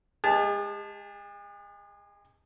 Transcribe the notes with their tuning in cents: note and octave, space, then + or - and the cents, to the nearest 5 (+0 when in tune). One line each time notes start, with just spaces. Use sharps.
G#3 +0 G#4 -45 A5 -10